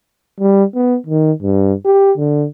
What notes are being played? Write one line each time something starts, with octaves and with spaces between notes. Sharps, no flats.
G3
B3
D#3
G2
G4
D3